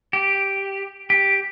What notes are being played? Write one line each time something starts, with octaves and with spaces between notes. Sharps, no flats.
G4
G4